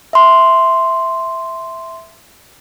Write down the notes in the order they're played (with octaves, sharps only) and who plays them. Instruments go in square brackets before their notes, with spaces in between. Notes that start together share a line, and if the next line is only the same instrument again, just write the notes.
[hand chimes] E5 C6